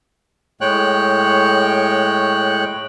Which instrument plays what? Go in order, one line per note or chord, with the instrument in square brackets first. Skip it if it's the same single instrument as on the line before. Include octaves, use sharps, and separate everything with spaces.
[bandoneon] A2 G#3 C#5 G5 F#6